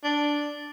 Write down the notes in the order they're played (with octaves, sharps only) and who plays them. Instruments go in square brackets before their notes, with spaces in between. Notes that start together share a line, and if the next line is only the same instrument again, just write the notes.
[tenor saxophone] D4